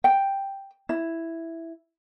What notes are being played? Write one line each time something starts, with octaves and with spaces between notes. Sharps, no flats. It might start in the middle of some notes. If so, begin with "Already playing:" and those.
G5
E4